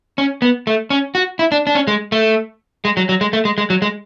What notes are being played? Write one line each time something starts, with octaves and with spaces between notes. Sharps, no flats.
C#4
B3
A3
C#4
F#4
E4
D4
D4
C#4
G#3
A3
G#3
F#3
F#3
G#3
A3
G#3
G#3
F#3
G#3